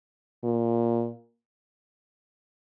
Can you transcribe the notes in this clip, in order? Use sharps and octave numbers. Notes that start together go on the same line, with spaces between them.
A#2